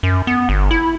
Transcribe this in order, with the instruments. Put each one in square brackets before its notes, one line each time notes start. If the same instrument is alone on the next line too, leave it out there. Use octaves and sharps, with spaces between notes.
[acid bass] F#2
B3
G1
E4